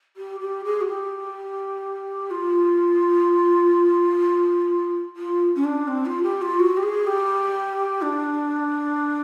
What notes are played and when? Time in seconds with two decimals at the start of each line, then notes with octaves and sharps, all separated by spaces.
0.17 G4
0.40 G4
0.65 G#4
0.81 F#4
0.88 G4
2.31 F4
5.16 F4
5.56 C#4
5.64 D4
5.88 C4
6.06 F4
6.23 G4
6.42 F4
6.59 F#4
6.77 G4
6.83 G#4
7.07 G4
8.02 D4